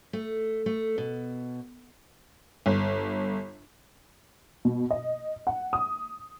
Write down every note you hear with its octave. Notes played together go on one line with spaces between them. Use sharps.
A3
A3
B2
G1
B2
D#5
F#5
D#6